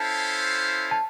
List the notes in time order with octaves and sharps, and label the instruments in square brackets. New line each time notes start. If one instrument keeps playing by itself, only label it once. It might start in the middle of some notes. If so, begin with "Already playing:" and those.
Already playing: [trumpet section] C#4 E4 A4 C5 F5 [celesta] A5
[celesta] A5